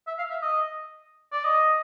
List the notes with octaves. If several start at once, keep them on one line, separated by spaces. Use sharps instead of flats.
E5
F5
E5
D#5
D5
D#5